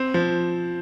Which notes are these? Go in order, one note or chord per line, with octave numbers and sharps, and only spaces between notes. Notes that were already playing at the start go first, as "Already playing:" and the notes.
Already playing: C4
F3